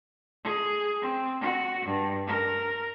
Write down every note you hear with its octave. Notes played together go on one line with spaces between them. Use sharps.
G#4
C4
F#4
G2
A#4